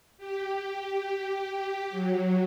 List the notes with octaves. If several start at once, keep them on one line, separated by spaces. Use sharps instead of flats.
G4
F#3